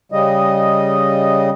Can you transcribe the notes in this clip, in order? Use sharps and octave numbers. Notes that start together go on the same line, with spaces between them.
C#3 G3 D#5